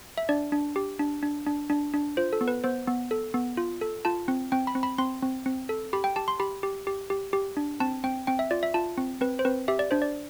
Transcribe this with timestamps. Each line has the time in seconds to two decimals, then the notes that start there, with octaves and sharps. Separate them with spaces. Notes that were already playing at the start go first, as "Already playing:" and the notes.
0.18 E5
0.29 D4 D5
0.52 D4
0.76 G4
0.99 D4
1.23 D4
1.47 D4
1.70 D4
1.94 D4
2.17 F4 C5
2.33 A4
2.41 B3
2.48 B4
2.64 B3 C5
2.88 B3
3.11 A4
3.34 B3
3.57 F4
3.81 A4
4.05 F4 A5
4.28 C4
4.52 C4 G5
4.67 B5
4.75 C4
4.83 B5
4.98 C4 C6
5.22 C4
5.46 C4
5.69 A4
5.93 G4 B5
6.04 G5
6.16 G4 A5
6.28 C6
6.40 G4 B5
6.63 G4
6.87 G4
7.10 G4
7.33 G4
7.57 D4
7.80 C4 A5
8.04 C4 G5
8.27 C4 G5
8.39 E5
8.51 F4 D5
8.63 E5
8.74 F4 A5
8.98 C4
9.21 C4 B4
9.39 C5
9.45 C4 B4
9.68 G4 E5
9.79 D5
9.91 D4 C5
10.02 D5